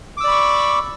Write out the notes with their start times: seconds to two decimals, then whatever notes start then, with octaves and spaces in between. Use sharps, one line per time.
0.17 D6
0.21 E6
0.24 D5
0.28 B5
0.31 C#6